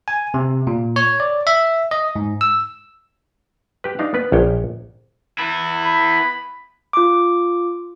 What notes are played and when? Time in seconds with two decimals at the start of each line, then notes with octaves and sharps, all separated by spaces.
0.08 G#5
0.34 C3
0.67 A#2
0.96 C#5
1.20 D5
1.47 E5
1.91 D#5
2.16 G#2
2.41 E6
3.84 G4 B4
3.99 D4 D#4 F5
4.14 B3 B4
4.32 A#1 G#4 C#5 G5
5.39 B3 E4
5.85 B5
6.93 F4 D6